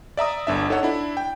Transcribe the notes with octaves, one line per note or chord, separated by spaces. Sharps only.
D5 E5 A#5 D#6
G1 D4 E5
D#4 A4 C#5 F#5
D4 E4
G5